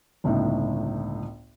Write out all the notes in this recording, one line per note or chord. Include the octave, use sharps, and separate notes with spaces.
G1 C#2 A2 D#4